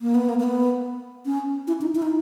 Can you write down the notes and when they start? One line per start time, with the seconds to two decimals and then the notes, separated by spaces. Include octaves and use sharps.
0.01 A#3
0.15 B3
0.29 A#3
0.40 A#3
0.43 B3
1.26 C#4
1.67 E4
1.81 D#4
1.95 E4
2.02 D#4